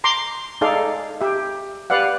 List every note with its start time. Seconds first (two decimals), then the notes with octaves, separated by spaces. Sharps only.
0.04 A#5 C6 D6
0.61 D#4 G#4 A4 D5 F5
1.21 G4 E5
1.90 G4 B4 D5 F5 F#5